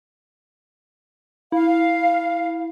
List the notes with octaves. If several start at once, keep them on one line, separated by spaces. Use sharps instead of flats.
E4 F5